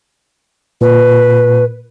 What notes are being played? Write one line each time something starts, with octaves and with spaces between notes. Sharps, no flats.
A#2 B4